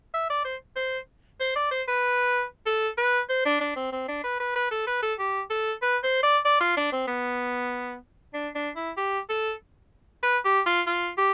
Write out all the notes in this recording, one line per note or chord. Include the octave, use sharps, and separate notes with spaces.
E5
D5
C5
C5
C5
D5
C5
B4
A4
B4
C5
D4
D4
C4
C4
D4
B4
B4
B4
A4
B4
A4
G4
A4
B4
C5
D5
D5
F4
D4
C4
B3
D4
D4
E4
G4
A4
B4
G4
F4
F4
G4